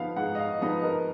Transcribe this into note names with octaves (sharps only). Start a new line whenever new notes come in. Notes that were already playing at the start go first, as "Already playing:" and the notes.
Already playing: F3 B3 D#4 F5
G#2 F#5
D#5
F5
F3 B3 D#4 D#5
A#4